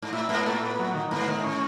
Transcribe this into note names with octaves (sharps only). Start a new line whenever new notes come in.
G#2
A2 E4
G#2 B3
A2 A4
B3
F#3
D#3
G#2 B3
D#3
C#4